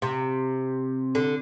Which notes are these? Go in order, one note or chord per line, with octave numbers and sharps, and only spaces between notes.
C3
D3